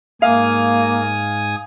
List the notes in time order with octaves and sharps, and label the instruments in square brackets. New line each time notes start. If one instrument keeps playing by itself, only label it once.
[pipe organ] G#2 G#5 D#6 [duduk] A#3 [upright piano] F5